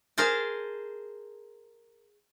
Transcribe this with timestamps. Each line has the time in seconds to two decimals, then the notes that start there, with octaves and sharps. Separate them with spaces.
0.18 G#4 A#4 C5 A5